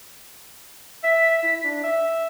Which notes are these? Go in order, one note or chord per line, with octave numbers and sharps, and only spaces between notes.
E5 B6
E4
D4
E5